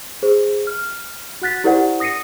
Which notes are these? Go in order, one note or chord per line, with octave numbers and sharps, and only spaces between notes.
G#4 C5
F6
F#4 F#5 F#6 A6 B6
E4 G4 A#4 C5 D5 F#5
D#6 A#6 C7 C#7 D#7